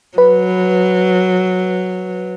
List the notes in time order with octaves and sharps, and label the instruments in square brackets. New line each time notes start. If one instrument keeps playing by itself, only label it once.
[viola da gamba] F#3 [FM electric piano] B4